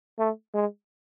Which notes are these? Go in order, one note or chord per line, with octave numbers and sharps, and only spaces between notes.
A3
G#3